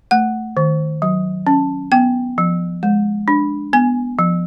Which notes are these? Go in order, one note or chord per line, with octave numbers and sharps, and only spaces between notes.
A3 F#5
D#3
F#3
C#4
B3 G5
F3
G#3
D4
B3 G#5
F3